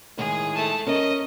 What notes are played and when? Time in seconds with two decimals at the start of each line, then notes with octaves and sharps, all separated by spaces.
0.18 A2 D#3 G#3 G#4
0.55 A3 A5
0.87 C#4 A#4 D#5